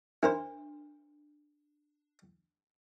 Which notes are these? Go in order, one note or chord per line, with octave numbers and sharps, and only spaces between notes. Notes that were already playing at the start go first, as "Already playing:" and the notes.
D4 E4 A#4 C5